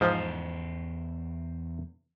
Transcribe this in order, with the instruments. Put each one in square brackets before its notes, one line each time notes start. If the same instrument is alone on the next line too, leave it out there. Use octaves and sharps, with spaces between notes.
[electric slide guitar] E2 C5 [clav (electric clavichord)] G#2 F3